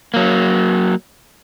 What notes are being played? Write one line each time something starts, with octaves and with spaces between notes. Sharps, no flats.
F#3 A#3